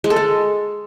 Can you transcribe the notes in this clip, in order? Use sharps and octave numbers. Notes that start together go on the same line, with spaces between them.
G#3
A4
G#3